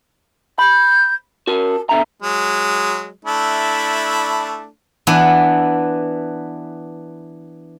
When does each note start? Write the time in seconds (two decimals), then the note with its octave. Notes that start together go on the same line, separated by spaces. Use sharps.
0.59 B5 G6
1.47 F#4 A#4 A5
1.89 B2 D3 E5 A#5
2.22 F#3 G#3
3.25 A3 D4 E4
5.07 E3 B3 D4